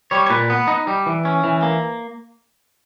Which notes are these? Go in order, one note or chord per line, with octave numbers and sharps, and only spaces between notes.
G3 C#5
C#5
A#2 B4
B3
D#4
G3
E3
C#4
E3
A#3